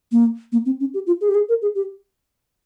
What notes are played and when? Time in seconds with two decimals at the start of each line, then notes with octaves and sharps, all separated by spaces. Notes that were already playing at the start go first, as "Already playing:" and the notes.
0.12 A#3
0.52 A#3
0.66 C4
0.80 C#4
0.94 G4
1.07 F4
1.21 G#4
1.29 G4
1.35 G#4
1.49 A#4
1.62 G#4
1.75 G4